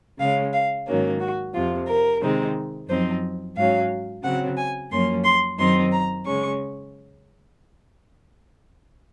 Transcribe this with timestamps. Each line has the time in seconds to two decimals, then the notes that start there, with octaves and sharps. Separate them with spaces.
0.19 C#3 G#3 C#4 F5
0.53 F5
0.87 G#2 D#3 F#3 A#3 C#4
1.20 F#4
1.54 F2 C3 F3 F4
1.87 A#4
2.22 C3 D#3 G#3 C4 D#4
2.89 F#2 F3 C4 D#4 C5
3.56 G#2 F#3 C#4 F5
4.24 C#3 F#3 C4 F#5
4.57 G#5
4.91 F#2 F3 A#3 C#4 C6
5.24 C6
5.58 F#2 D#3 F#3 C4 D#4 C6
5.92 A#5
6.26 C#3 G#3 C#4 C#6